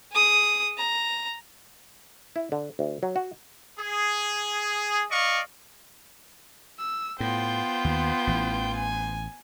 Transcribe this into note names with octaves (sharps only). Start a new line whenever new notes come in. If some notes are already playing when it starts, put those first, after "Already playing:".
G#4 D#6
A#5
E4
D3
D2
F#3
F#4
G#4
D5 D#5 F5 C#6
E6
A2 B3 F4 C5 G5
D#2
A1 E3
G#5